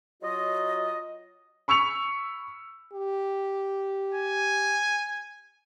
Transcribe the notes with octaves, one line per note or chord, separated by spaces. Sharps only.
F#3 F4 D#5
B5 C#6 E6 C#7 F7
G4
G#5